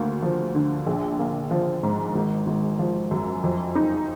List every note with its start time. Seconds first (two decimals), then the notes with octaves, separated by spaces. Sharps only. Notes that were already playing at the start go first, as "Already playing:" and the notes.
Already playing: D2 A#3
0.22 F3
0.55 D3
0.87 A#1
1.19 A#3
1.51 F3
1.83 G#2
2.15 G#1
2.47 G#1
2.79 F3
3.11 F#2
3.43 F2
3.75 D#4